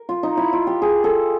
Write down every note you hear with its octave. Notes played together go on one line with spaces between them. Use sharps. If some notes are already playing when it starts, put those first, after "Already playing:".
Already playing: A#4
F4
D#4
E4
F4
G4
G#4
A4